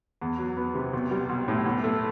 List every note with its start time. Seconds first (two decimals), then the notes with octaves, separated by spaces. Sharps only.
0.22 E2
0.39 F#3
0.57 B3
0.75 C3
0.93 B1
1.11 G3
1.29 B1
1.48 A2
1.66 B1
1.84 A3